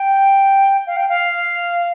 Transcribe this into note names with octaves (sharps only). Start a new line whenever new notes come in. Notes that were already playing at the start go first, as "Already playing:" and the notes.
Already playing: G5
F5
G5
F5